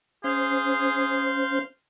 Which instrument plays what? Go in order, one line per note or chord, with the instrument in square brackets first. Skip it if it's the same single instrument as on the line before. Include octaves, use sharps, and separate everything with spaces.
[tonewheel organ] C#4 C5 [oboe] G#4 [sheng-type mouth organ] F5 C6 G6